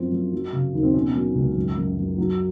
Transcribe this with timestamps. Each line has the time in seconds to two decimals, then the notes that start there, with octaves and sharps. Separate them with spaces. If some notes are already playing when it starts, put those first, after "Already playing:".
Already playing: F#2 F3 C4
0.12 F#2
0.33 F#3
0.53 C#3
0.73 D#2
0.83 C4
0.94 B2 C#4
1.15 F#3
1.35 C#2
1.56 F#2
1.77 F#2
1.98 F#2
2.18 F#3